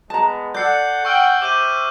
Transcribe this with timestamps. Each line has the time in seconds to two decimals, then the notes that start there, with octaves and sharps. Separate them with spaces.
0.10 G#3 B3 A5 A#5
0.55 A4 D5 F#5 G6 C7
1.05 F#5 G5 C#6 E6 F6
1.42 G4 C5 E5 D6 G6 D#7